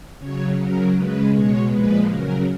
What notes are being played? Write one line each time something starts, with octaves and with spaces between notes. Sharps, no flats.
C#3 F#3 C#5
C#3 F#3 A#4
C#3 G#3 B4
B2 G#3 C#5
A#2 F3 G#3 B4
C#3 F#3 A#4